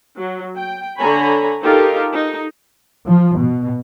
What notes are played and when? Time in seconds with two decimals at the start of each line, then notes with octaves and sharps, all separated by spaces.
0.16 F#3
0.57 G5
0.98 D3 C#5 G#5 A#5 B5
1.63 D#4 F4 G4 A4 A#4
2.14 D#4
3.07 F3
3.37 B2